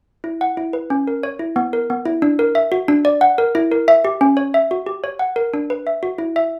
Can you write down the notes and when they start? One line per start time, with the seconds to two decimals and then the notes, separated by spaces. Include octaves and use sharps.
0.24 E4
0.41 F#5
0.57 E4
0.73 B4
0.90 C#4
1.07 A#4
1.23 C#5
1.39 E4
1.56 B3
1.73 A#4
1.90 B3
2.05 E4
2.22 D4
2.39 A#4
2.55 E5
2.72 F#4
2.88 D4
3.05 D5
3.21 F#5
3.38 A#4
3.55 E4
3.72 A#4
3.88 E5
4.05 G4
4.21 C#4
4.37 C#5
4.54 E5
4.71 F#4
4.86 G4
5.04 C#5
5.19 F#5
5.36 A#4
5.54 D4
5.70 B4
5.87 E5
6.03 F#4
6.18 E4
6.36 E5